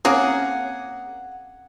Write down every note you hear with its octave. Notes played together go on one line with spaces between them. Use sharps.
A#3 C4 C#4 G#4 C#5 F#5